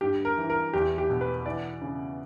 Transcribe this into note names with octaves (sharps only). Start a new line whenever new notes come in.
G2 G4
A#4
E3
A#4
E2 G4
G4
B2
B4
E3 D5
C#3